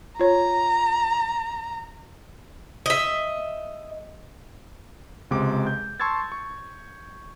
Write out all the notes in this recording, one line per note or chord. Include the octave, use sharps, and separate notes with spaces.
F4 C#5 A#5
D#5 E5
C#2 C3 G#3 D6
G6
A5 C6 C#6 E6 G#6 A6
C#6